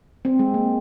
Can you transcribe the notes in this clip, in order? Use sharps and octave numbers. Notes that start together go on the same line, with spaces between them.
C4
G#3
A#3